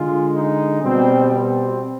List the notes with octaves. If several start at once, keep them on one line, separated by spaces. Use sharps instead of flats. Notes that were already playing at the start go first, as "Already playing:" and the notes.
Already playing: D3 G#3 F4
D#4
B2 G3 C4
C4